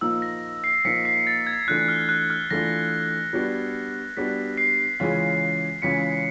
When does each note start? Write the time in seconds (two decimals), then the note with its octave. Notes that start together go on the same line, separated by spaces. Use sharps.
0.01 A#2 F3 A#3 D#4 E6
0.22 A#6
0.64 C7
0.85 A#2 F3 A#3 D#4 B6 C#7
1.05 C7
1.27 A6
1.47 G#6
1.67 E3 A3 D4 F4 F#6
1.88 F6
2.09 F#6
2.30 F6
2.51 E3 A3 D4 F4 A#6
3.33 G3 B3 D4 F#4
4.17 G3 B3 D4 F#4 B6
4.58 C7
5.00 C#3 E3 G#3 C#4 F4
5.82 C#3 E3 G#3 C#4 F4 B6 C#7